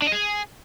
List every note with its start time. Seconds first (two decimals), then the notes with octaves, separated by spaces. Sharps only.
0.02 D4
0.07 D#5
0.12 G#4